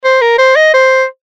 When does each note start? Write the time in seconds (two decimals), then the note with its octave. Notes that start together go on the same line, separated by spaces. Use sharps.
0.04 C5
0.21 A#4
0.38 C5
0.56 D#5
0.74 C5